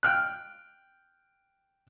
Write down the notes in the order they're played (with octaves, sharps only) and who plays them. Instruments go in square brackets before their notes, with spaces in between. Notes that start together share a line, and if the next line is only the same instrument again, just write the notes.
[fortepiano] G5 F6 F#6